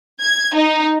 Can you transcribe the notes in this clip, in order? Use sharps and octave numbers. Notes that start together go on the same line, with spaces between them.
G#6
D#4